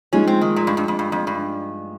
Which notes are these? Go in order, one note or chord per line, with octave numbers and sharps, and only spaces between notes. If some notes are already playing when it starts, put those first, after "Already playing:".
F3 G#3 C#4 D#4
C4
D#3
A#2
G2
G2
F2
G2
F2
G2